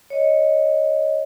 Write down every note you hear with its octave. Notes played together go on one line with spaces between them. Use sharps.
C#5 D#5